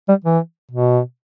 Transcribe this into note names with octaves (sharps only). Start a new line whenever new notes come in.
G3
E3
B2